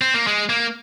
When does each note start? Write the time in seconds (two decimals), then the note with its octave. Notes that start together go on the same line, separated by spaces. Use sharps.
0.01 C4
0.14 A#3
0.27 G#3
0.49 A#3